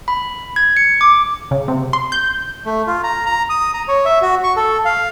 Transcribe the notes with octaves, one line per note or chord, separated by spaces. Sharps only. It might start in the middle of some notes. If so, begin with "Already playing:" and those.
B5
G#6
C#7
D6
C#3
C3
C6
G6
A3
F4
A#5
A#5
D#6
A#5
C#5
E5
F#4
C#6
A4
F5